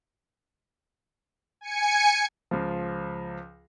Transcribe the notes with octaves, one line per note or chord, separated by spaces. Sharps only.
G#5 C#7
C#2 F3